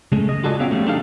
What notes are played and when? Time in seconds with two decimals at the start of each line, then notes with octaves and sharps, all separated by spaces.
0.12 C#3 G#3 A3
0.29 D#5
0.44 F4 F#4 G#4 A4 D5 D#5
0.60 B3 C#4 C#5 E5 F5 G5
0.71 F3 G3 A3 C#4
0.87 A3 D4 D#4 G4 A4 F5